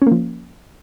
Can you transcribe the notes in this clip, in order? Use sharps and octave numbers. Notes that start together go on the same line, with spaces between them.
F3 A#3 C#4